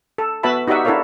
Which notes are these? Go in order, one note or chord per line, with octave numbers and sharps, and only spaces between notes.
A4
B3 F#4 B4 E5 A5 B5
D#4 F#4 G4 D5 E5 F#5
D4 E4 A4 A#4 C#5 F5